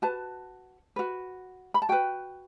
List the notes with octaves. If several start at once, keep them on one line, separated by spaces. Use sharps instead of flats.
F#4 B4 A5
F#4 B4
B5
A5
F#4 B4 G5